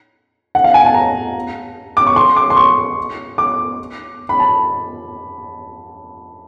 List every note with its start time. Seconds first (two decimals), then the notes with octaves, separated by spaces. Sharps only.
0.55 F#5
0.64 F5
0.74 G#5
0.85 A5
0.94 A#5
1.97 D6
2.07 C#6
2.16 C6
2.36 D6
2.50 C6
2.57 C#6
3.38 D6
4.29 B5
4.40 A5